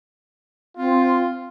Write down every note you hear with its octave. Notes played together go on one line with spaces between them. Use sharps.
C4 F4